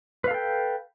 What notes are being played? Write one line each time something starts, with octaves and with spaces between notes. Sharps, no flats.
A4 B4 F5 G5